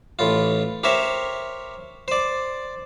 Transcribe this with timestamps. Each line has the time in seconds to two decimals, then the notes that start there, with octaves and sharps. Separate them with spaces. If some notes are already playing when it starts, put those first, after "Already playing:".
0.19 A1 A2 F4
0.84 G4 A#4 C5 C#5 E5
2.08 C5 D5